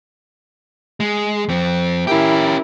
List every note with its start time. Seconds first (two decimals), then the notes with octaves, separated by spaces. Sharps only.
1.00 G#3
1.49 F2 C4
2.07 C#4 E4 G4 A#4